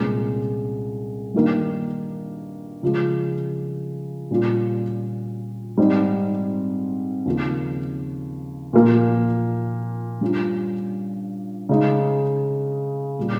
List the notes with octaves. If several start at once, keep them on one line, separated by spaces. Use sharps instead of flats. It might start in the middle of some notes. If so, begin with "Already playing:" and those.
Already playing: C2 A#2 G#3 C#4
G2 D#3 A#3
C#3 F3 G#3
A#2 G3 C#4 F4
G#2 G3 C4 D#4
D#2 C#3 F3 A#3
A#2 F3 A#3
G2 G3 C#4 F4
C#3 G#3 D#4
A#2 G3